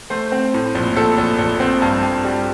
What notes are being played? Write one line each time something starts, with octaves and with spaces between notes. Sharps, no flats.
A3 C5
C4
A2
A#1
A#1 A4
A#1
A#1
C4
G2
G2
G3